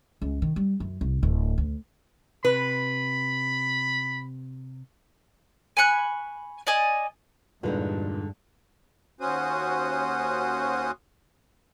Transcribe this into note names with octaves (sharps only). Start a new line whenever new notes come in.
C#2
D#3
G3
F#2
C2
D1
D2
C3 B4 B5
G#5 B5 C#6 F#6
D5 D#5 G#5
E2 G2 A#2 D3 G#3 D#4 B4
D#2 C#4 F#4 C5 D#6